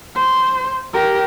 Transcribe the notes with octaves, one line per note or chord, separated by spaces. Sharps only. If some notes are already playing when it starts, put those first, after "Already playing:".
C5
G4 A#4